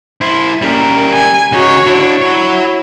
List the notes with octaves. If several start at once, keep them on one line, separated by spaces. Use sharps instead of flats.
E4 C5
G3 A#3 C#4 A#4
G#5
C#3 D#4 F#4 C#5
D4 E4
E4 F#4 C#5